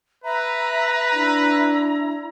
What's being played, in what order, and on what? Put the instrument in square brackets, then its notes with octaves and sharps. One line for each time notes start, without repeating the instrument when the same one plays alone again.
[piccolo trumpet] B4 [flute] E5 [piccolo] A#5
[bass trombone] D4 [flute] E4